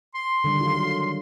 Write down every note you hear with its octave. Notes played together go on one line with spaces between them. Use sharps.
C6
D3 D#3 G3
F#3 F4